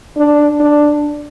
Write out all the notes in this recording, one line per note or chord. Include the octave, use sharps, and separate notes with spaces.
D4
D4